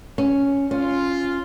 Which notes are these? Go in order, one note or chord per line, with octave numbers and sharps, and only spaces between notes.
C#4
C#4 F4